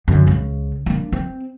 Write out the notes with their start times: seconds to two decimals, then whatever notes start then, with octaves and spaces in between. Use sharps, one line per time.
0.08 F#2 D3
0.27 C#2 C#3
0.86 A#3 D4
1.12 C4